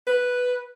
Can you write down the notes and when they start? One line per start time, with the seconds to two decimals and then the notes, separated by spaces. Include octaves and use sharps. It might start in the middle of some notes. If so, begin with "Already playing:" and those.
0.07 B4